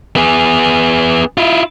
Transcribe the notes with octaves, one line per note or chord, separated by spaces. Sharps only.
B3 G#4
E4 F4